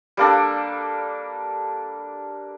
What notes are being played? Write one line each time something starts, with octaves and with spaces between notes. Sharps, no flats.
G3 A#3 D4 A4